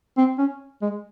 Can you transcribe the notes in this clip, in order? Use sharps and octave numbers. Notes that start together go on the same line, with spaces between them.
C4
C#4
G#3